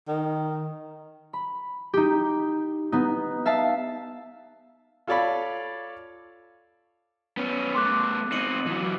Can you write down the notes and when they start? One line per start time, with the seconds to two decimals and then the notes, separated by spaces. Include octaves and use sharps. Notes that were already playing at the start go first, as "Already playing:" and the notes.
0.08 D#3
1.33 B5
1.94 D#4 G4
2.92 B3 D#4
3.46 E5 F5 A5
5.07 F4 A4 C#5 D5 F5 B5
7.37 B3 C#4
7.75 A3 B3 C6 D6 F#6
8.32 C4 D#4 C#7 D#7 F#7
8.66 E3 F#3